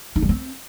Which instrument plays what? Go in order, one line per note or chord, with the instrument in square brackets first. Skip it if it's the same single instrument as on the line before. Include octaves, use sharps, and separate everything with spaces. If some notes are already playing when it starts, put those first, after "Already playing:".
[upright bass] D#4
G3
C4